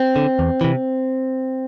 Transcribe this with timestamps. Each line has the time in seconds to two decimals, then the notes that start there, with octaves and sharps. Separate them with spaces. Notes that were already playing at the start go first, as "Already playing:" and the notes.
Already playing: C4
0.16 D3
0.39 E2
0.61 C3 E3